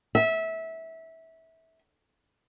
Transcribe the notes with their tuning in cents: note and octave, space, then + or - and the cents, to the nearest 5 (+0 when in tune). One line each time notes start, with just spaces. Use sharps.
E5 -20